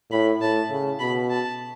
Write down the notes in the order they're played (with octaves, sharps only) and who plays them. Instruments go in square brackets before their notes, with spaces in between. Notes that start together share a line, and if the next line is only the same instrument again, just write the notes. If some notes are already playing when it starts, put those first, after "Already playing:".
[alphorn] A2 [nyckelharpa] B5
[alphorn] A2 [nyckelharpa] A5
[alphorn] C#3
[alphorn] B2 [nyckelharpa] B5
[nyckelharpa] A5